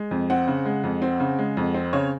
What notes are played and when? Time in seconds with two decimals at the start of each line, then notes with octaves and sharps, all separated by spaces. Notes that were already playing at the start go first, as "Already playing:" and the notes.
Already playing: G#3
0.11 F2
0.30 C4 F#5
0.48 C#3
0.65 G#3
0.84 F2
1.02 C4
1.20 C#3
1.39 G#3
1.57 F2
1.74 C4
1.93 C#3 C#5